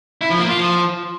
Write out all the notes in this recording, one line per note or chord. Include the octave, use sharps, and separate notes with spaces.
E4
F3
A#3
F4
F3